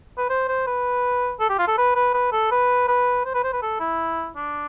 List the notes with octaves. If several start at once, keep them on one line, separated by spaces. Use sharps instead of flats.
B4
C5
C5
B4
A4
G4
F4
A4
B4
B4
B4
A4
B4
B4
C5
B4
C5
B4
A4
E4
D4